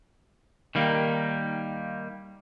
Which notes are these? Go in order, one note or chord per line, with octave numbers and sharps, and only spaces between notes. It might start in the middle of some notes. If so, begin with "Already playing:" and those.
D#3 G3 A#3